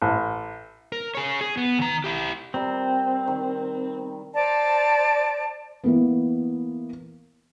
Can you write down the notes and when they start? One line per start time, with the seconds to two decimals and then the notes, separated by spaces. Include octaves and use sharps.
0.02 A1
0.92 A#4
1.15 G#4 C#5
1.41 G#4
1.57 B3
1.79 D#3 A#5
2.04 E4 G4
2.54 C3 G3 C4 A#4
3.27 D#3
4.34 C5 D5 A5 A#5
5.84 E3 A#3 B3